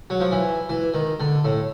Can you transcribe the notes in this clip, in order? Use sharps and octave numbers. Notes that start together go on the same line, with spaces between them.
F#3
F3
E3
E3
D#3
D3
A2